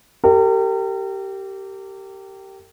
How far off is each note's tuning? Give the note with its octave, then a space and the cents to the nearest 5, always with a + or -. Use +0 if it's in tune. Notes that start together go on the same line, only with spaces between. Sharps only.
G4 -15 A#4 -40